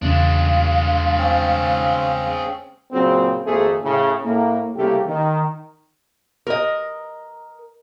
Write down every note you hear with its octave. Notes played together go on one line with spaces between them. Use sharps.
E2 C#3 G#3 D4 F5
C4 C#4
A#2 C#3 F#3 C4
G#1 F2 A3 A#3 G#4 C5
A2 C#3
A2 A#3
C2 C#3 A3 A#3 G4
D#3
A#4 D#5